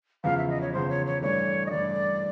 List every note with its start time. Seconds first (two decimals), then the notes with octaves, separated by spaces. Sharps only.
0.24 E2 C#3 F3 F5
0.37 E5
0.49 D#5
0.61 C#5
0.72 E2 C#3 F3 C5
0.89 C#5
1.06 C#5
1.22 G2 E3 A3 D4 C#5
1.66 D#5
1.70 G2 E3 A3 D4 D5